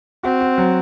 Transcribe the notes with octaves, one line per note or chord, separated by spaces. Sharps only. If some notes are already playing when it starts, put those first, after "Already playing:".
C4 F#4
F#4
F#3